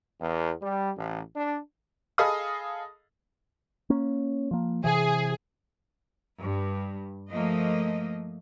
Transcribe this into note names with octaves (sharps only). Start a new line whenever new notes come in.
E2
G3
A1
D4
G#4 A4 D#5 F5 B5 D#6
A#3 C#4
F3 A#3
C3 E3 G#4
G2
F3 A3 A#3 D#5